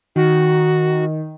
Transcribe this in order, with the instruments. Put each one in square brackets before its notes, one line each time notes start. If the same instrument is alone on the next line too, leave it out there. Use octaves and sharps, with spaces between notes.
[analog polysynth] D#3 [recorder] F#4